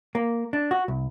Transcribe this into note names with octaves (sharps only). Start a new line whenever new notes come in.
A#3
D4
F#4
C2